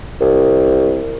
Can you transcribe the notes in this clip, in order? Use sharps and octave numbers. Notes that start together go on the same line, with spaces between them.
C2